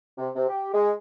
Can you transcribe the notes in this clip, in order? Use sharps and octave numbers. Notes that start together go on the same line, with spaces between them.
C3
C3
G4
G#3